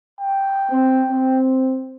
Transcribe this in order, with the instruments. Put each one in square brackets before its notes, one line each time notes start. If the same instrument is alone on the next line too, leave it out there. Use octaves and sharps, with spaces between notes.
[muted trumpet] G5
[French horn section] C4
C4